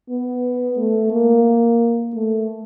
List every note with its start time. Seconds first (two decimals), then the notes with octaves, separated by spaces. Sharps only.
0.10 B3
0.77 A3
1.12 A#3
2.15 A3